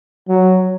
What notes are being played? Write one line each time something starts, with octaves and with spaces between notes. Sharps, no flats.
F#3